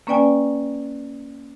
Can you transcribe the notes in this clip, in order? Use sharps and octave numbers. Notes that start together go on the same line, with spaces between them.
A#3 C#4 B4 D5 G5 G#5